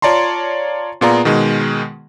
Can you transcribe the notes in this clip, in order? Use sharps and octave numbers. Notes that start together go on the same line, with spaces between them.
F4 C#5 D5 A5 A#5 C6
A#2 B3 F4 G#4 D5 A#5
B2 D#3 G#3